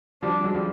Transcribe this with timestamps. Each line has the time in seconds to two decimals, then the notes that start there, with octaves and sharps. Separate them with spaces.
0.23 F3 G3 D4
0.44 F#3 G#3
0.55 F3 G3